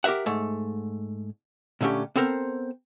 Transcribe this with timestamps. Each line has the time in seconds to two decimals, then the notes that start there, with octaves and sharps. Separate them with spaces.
0.04 G4 A#4 B4 E5 F#5
0.26 G#2 A3
1.81 A#2 D3 A3 C#4 G4
2.16 B3 C4 A4 A#4 C5